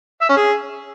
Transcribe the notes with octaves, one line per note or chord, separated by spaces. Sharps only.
E5
C#4
G#4